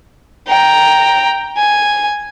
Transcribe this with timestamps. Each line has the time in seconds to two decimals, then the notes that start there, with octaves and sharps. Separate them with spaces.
0.47 G5 A#5
1.57 G#5